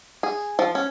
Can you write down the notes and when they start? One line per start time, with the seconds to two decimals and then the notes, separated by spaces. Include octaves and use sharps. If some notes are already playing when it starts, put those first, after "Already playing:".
0.23 G#4
0.59 F3
0.75 C#4